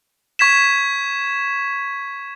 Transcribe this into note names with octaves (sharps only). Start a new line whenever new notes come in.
C#6 G#6 B6 E7